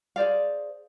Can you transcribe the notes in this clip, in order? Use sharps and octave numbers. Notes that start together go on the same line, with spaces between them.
G#4 C5 D5 F5